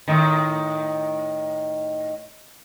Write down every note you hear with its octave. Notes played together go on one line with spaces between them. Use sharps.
A2 D#3